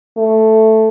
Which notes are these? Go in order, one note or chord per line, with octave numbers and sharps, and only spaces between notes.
A3